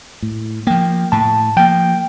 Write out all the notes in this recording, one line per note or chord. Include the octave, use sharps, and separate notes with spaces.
A2
F3 A#3 G5
A2 A5
F3 A#3 G5